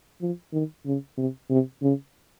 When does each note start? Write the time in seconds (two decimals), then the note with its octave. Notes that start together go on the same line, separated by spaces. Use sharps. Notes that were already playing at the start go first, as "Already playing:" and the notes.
0.21 F3
0.53 D#3
0.86 C#3
1.18 C3
1.50 C3
1.83 C#3